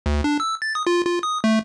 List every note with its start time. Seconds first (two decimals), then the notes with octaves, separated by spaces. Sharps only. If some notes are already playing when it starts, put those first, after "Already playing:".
0.06 D2
0.24 D4
0.40 E6
0.62 A6
0.75 D#6
0.87 F4
1.07 F4
1.23 D#6
1.44 A3